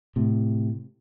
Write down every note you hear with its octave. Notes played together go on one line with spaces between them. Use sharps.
A2 C3